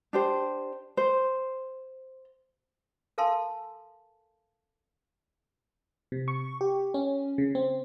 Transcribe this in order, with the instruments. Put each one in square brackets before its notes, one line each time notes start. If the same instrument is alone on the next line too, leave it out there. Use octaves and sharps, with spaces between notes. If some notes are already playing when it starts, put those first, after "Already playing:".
[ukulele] D4 G4 C5
C5
[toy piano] A4 A#4 F5 G#5 A5 C6
[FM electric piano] C3
C#6
G4
C#4
C#3
C4